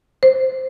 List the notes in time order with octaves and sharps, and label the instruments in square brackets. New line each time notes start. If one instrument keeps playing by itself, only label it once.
[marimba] C5